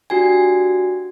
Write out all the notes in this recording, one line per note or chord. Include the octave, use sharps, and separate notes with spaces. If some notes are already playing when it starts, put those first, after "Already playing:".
D4 F#4 G4 G#5